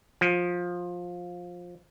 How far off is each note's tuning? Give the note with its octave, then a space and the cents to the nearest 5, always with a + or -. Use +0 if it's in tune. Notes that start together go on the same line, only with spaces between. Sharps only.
F3 +15